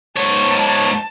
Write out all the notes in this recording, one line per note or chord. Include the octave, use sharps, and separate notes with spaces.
G#2 C#5 A5